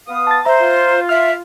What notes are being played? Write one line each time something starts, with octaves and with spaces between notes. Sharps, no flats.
B3 F5 D#6
A5 A6
C5 E5 A#5
F4
E5 F6